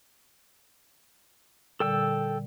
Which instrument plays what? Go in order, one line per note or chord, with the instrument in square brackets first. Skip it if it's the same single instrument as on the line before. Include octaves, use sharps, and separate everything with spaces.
[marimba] A#2 D3 G3 [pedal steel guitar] A4 G5 E6